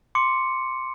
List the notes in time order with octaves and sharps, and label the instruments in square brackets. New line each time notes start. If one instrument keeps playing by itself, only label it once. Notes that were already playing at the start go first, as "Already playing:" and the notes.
[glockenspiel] C6 D6 C#7